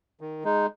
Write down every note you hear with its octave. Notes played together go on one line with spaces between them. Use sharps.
D#3
G#3 D#4